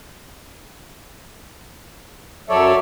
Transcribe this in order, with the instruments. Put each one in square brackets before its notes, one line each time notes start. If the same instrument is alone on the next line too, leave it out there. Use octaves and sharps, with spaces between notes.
[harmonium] F#2 F#3 E5 [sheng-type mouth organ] A4 C#5 D5